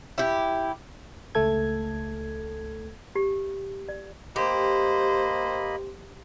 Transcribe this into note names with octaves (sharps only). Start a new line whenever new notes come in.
E4 G4
C#2 A3 A4 G#6
G4
D5
A#3 G4 C5 D#5 B5